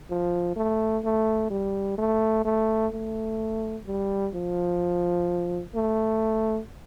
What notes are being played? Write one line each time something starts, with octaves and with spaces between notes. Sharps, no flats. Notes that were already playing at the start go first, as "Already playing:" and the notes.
F3
A3
A3
G3
A3
A3
A3
G3
F3
A3